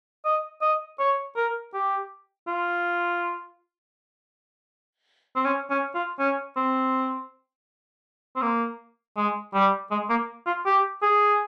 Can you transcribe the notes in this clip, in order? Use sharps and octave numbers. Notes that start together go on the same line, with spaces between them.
D#5
D#5
C#5
A#4
G4
F4
C4
C#4
C#4
F4
C#4
C4
C4
A#3
G#3
G3
G#3
A#3
F4
G4
G#4